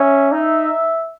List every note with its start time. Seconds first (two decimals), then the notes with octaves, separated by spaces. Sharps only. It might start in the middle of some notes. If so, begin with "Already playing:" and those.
Already playing: C#4 E5
0.32 D#4 E5